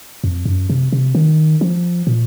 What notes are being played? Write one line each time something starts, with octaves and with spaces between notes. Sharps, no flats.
F2
F#2
C3
C3
D#3
F3
A#2